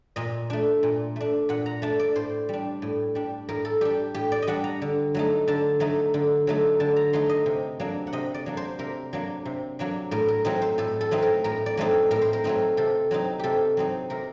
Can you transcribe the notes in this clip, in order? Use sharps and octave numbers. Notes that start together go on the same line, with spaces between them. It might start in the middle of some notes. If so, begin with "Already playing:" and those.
A#2 D#5
A3 D4
A#2
A3 D4
A#2 F#5
A#5
A3 D4 A5
D5
A2 C5
G3 D4
A2
G3 D4
A2 A#4
A4
G3 D4 G4
A2 G4
D5
D#5
G3 D4 F#5
A#5
D3
F#3 A3 D#4
D3 A5
F#3 A3 D#4
D3
F#3 A3 D#4
D3 A5
A#5
F#3 A3 D#4 C6
D#5
C3
F#3 A#3 D4
F#5
C3 D#5
D5
F#3 A#3 D4
C5
C3 A#4
F#3 A#3 D4
C3
F#3 A#3 D4
A2 A#4
A#4
F#3 A3 C4 D#4 A#4
C5
A2 A4
A4
F#3 A3 C4 D#4
A#4
A2 A#4
D5
F#3 A3 C4 D#4
A2 A#4
C5
A#4
F#3 A3 C4 D#4
C3 A4
F#3 C4 D#4
C3 G4 A4
F#3 C4 D#4
C3 A#4